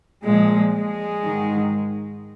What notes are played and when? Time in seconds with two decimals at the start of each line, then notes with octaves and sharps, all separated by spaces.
0.25 A#2 F3 G#3
0.74 G#3
1.23 G#2 D#3